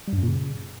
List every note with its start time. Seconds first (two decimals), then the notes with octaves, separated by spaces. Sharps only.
0.08 G3
0.13 G2
0.18 F#2
0.23 A#2
0.28 C#3